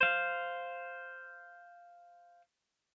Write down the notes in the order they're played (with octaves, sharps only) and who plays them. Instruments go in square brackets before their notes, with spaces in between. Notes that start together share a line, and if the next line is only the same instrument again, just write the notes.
[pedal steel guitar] C5 F5